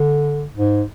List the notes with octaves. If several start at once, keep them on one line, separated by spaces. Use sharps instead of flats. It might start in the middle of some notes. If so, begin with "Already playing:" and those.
Already playing: D3
G#2